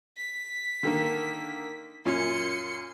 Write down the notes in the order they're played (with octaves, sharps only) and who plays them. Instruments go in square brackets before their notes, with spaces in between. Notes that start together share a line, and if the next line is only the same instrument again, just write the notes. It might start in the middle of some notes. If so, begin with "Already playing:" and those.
[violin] B6
[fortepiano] D3 D#3 A#3
[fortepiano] F#2 A#2 C#4 [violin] C6 C#7